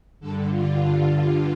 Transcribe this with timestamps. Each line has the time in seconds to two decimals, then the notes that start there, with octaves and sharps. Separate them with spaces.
0.20 G2 D3 A4
0.50 F4
1.11 F4